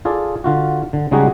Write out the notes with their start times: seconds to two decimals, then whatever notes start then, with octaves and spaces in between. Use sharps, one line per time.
0.05 F4 G#4 A4 D5
0.44 D3 F4 F#4
0.93 D3
1.11 C#3 G3 G#3 D#4 F#4 G#4